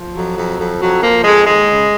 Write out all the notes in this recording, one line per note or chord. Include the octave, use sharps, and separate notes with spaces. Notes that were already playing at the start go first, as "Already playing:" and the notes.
Already playing: F3
F2 F#3
F2
F2
F2 F#3
F3 A#3
F2 G#3
D#2 G#3
C#3